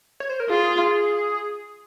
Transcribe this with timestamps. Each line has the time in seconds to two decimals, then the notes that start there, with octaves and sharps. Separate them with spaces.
0.20 C#5
0.29 C5
0.40 A#4
0.49 F4 G#4